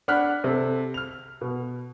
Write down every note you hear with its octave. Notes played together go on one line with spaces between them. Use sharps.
D4 F#5 B5 F6 F#6 B6
C3 A4
F6 F7
B2